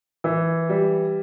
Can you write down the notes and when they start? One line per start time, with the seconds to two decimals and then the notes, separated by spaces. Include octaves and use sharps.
0.24 E3
0.69 G3